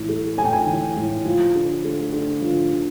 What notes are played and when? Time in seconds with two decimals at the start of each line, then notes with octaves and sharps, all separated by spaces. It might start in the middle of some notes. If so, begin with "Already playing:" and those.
Already playing: A2 E3
0.09 A3
0.38 A2 G#5
0.45 G5
0.53 G#5
0.67 E3
0.97 A2
1.25 F3
1.55 D3
1.84 A3
2.12 D3
2.42 F3
2.71 D3